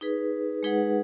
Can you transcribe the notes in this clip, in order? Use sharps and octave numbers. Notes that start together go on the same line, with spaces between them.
D#4 G#4 B4
G#3 D#4 G#4 B4 F#5